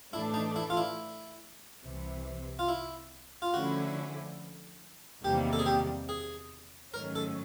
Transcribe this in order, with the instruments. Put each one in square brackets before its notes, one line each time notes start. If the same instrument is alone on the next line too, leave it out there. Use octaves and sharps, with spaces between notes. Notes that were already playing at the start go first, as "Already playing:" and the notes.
[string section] A2 E3 A3 D4 [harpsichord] E4
[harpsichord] D#4
E4
F4
E4
[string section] C2 C3 E3
[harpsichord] F4
E4
F4
[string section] D3 F3 A3 C#4 E4 [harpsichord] F#4
[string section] E2 C3 D#3 G3 A#3 [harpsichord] G4
[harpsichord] A4
G#4
G4
G#4
[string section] G#2 D#3 F#3 A3 C#4 [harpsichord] A#4
[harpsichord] A4